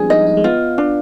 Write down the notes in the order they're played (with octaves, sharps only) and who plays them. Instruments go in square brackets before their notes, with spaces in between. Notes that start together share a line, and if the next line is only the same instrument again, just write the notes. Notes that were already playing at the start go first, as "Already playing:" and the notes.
Already playing: [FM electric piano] F3 G3 G#3 B3 C4 D4 [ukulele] G#4
[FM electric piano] D#4 [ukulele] D#5
[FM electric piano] D#4
G#3
[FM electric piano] B3 [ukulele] F4
[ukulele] D4